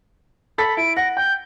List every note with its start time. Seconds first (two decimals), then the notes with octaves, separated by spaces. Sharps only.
0.58 A4 B5 A6 B6
0.77 E4 D7
0.97 F#5 A#6
1.17 G5 G6